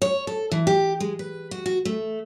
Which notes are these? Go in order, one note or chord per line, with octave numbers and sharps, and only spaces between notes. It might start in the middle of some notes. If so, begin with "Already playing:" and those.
C#5
A4
E3
G4
G#3
B4
F#4
F#4
A3